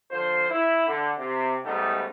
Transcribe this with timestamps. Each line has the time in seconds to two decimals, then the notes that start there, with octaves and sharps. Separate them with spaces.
0.10 D3 F3 F4 C5
0.49 E4
0.87 D3
1.18 C3
1.64 G#2 C#3 G3 A3 B3 D#4